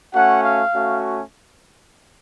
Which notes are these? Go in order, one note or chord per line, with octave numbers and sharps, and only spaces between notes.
A3 C#4 F#4 F#5
F5
A3 C#4 F#4